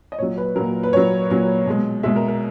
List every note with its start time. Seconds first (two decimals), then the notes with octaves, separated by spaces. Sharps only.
0.12 D#5
0.19 A#2 F#3 C#5
0.38 B4
0.56 A#2 F#3 A#4
0.83 B4
0.93 A#2 F#3 C#5
1.30 A#2 F#3
1.66 B2 G#3
2.03 B2 G#3 E5
2.16 A#4
2.28 A#4